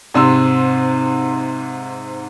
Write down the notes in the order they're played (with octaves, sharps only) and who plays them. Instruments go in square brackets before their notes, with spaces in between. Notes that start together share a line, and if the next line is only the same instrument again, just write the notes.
[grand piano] G#2 C3 C6 E6